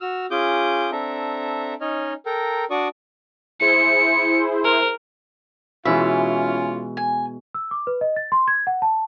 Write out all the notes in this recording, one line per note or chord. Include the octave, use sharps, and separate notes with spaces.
F#4 E6 F6
C#4 F4 G#4 D6 D#6 G6
C4 D4 A4 E5 A#5
C#4 D#4 C#5 D#5 F6
A4 A#4 G5 A#5
D4 F#4 D5 C#6 D#6
E4 G#4 C5 C#7
A#4
B2 E3 G#3 C#4 E4 F4 E5
G#5
E6
D6
B4
D#5
A6
C6
G#6
F#5
A5